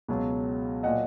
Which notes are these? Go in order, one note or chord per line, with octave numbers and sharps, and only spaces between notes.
C#2 B2 F#3
A#2 F#3 D#5 F#5